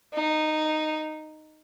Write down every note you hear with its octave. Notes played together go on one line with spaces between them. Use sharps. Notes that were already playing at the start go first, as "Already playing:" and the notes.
D#4